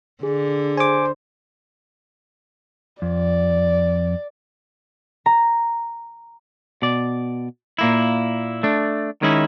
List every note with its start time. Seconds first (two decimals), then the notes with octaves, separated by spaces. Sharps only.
0.23 D3 G#4
0.77 C5 G#5 D6
3.02 F2 D5
5.26 A#5
6.82 B2 D5
7.79 A#2 A#3 E4
8.63 A3 D4
9.22 D#3 G#3 C#4 D#4 E4